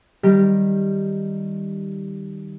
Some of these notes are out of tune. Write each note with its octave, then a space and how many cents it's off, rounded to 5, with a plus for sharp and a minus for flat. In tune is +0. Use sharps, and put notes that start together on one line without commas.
D#3 +0 G3 +0 G4 +0